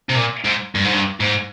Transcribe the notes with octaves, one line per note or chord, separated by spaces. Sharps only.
C3
A#2
G#2
G2
G#2
G2
G#2